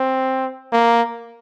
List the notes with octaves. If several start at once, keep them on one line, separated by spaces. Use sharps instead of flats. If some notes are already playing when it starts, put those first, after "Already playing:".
Already playing: C4
A#3